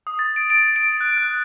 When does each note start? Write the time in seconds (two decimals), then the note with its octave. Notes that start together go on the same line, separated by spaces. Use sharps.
0.07 D#6
0.19 A6
0.36 D7
0.50 D7
0.76 D7
1.01 F#6
1.18 F#6